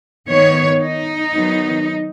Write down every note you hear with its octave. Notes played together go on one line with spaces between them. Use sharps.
D#3 B3 C#5
D#4
D#3 F#3 B3